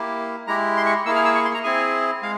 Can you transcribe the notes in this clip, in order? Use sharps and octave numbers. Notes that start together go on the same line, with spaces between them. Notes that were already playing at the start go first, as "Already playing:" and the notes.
Already playing: A#3 E4 G4
G#3 E4 G4 A#5
C6
C#6
A#3 E4 G#4 E6
F6
E6
C#6
C6
A#5
C4 E4 G#4 G#5
G#3 F5